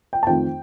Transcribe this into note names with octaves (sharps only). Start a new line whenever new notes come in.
G5
A5
F2 D#3 A3 C4 G5